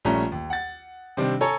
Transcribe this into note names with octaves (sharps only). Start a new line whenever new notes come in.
A#1 G3 A3 C#4 A#5
D#2
F#5 A6
C3 D#3 G3 C4 D4
A4 C#5 G#5 A#5